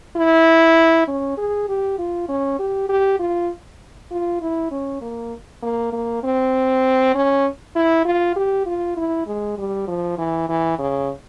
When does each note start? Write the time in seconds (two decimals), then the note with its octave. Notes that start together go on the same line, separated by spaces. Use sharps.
0.16 E4
1.08 C#4
1.38 G#4
1.69 G4
1.99 F4
2.28 C#4
2.59 G4
2.89 G4
3.19 F4
4.11 F4
4.42 E4
4.71 C#4
5.02 A#3
5.62 A#3
5.93 A#3
6.23 C4
7.15 C#4
7.76 E4
8.05 F4
8.36 G4
8.66 F4
8.97 E4
9.27 G#3
9.58 G3
9.88 F3
10.18 E3
10.49 E3
10.79 C#3